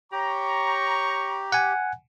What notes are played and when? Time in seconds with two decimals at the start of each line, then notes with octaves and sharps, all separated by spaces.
0.12 G4 C#5 G5 A#5 C#6
1.52 F#5 G#5